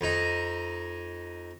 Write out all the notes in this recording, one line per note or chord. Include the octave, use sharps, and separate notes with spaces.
F2 D#4